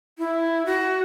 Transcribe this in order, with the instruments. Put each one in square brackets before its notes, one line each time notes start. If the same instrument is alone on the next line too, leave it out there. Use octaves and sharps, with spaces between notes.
[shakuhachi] E4
F#4